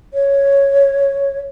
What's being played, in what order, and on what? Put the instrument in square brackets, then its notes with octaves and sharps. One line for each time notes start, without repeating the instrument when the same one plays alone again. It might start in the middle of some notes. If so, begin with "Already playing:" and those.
[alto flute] C#5